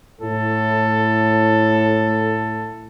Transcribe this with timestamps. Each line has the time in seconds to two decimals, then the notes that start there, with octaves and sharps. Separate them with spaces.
0.21 A2 A4